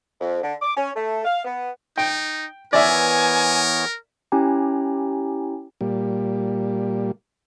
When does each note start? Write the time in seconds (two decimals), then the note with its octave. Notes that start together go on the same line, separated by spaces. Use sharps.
0.21 F2
0.43 D3
0.61 D6
0.77 C#4
0.96 A3
1.25 F5
1.45 B3
1.98 D#4 G5
2.73 E3 B3 A#4 C#5 D5 E5 G#5
4.32 C#4 E4 G4 G5 G#5 A#5
5.81 A#2 G3